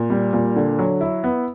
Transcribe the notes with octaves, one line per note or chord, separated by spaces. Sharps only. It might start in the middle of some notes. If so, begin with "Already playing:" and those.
Already playing: A#2
G3
A#2
D3
F#3
E4
B3